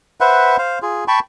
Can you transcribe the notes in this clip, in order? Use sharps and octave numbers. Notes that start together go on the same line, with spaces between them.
B4 C5 E5 F#5
C5 F5
F4 G#4
G5 A5 B5 C#6